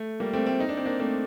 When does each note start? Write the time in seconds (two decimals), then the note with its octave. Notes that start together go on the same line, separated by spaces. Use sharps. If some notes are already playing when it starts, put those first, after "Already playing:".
Already playing: A3
0.20 G3 A#3
0.33 A3 C4
0.46 A3 C4
0.60 D#4
0.69 D4
0.77 C4
0.86 A#3 D4
1.00 A3 C4